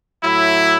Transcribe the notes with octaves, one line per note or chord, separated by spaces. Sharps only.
A2 F#3 E4